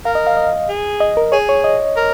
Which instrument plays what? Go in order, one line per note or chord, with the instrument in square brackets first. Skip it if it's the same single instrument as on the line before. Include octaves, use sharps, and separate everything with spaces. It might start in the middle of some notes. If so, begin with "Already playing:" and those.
[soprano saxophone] A#4 [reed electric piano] F5
[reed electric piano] D#5
F5
D#5
[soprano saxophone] G#4
[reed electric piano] D#5
A#4
[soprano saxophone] G#4 [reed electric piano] C#5
[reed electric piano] C#5
D#5
[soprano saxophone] A#4